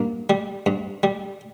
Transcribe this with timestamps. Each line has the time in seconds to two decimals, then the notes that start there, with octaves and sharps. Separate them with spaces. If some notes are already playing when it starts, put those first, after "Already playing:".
Already playing: G2 A#3
0.30 G3
0.66 G2
1.03 G3